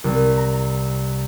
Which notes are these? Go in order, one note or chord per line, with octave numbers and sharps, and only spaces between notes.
C2
A#5